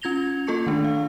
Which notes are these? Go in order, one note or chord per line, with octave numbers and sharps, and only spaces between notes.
C#4 F4 G#6 A#6 F7 G7
A#3 F4 A4 A5 C#6 C#7
D#3 A3 D4
F5